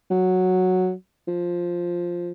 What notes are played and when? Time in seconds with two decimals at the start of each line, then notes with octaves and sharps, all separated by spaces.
0.11 F#3
1.28 F3